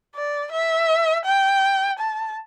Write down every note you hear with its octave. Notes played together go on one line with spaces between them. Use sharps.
D5
E5
G5
A5